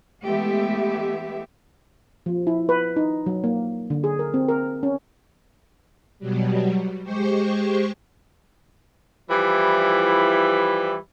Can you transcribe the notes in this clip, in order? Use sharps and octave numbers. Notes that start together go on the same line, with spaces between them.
E3 G#3 A3 B3 G4 E5
F3
E4
B4
D#4
F#3
A#3
D3
G#4
A#4
C4
A#4
C#4
B2 F#3 G3
G#3 G4 C5 C#6
E3 F3 G3 E4